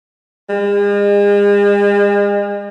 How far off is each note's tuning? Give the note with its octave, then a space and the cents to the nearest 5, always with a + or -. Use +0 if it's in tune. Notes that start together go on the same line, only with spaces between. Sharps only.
G#3 -40